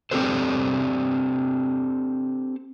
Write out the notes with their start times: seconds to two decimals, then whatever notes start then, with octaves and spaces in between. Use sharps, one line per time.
0.11 C4 D4 G4 A4 C5